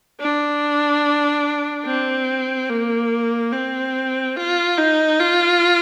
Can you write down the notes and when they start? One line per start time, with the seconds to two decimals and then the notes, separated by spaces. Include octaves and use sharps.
0.20 D4
1.86 C4
2.70 A#3
3.53 C4
4.36 F4
4.78 D#4
5.19 F4